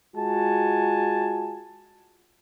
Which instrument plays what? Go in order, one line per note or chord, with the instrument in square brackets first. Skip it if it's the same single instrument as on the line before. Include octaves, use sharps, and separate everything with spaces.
[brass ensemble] G#3 F4 F#4 G#5 A5